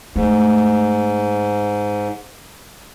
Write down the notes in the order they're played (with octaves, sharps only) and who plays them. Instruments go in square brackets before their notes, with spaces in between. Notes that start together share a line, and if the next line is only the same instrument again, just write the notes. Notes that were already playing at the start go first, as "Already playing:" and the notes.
[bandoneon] G#2 [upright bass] A3